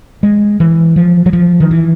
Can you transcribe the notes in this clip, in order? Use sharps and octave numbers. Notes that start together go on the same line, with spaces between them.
G#3
E3
F3
F#3
F3
D#3
E3